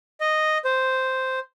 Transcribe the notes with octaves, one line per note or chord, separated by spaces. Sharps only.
D#5
C5